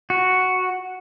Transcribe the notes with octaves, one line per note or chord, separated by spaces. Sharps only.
F#4